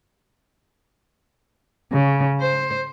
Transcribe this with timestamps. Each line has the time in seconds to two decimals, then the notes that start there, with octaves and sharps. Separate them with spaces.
1.92 C#3
2.41 C5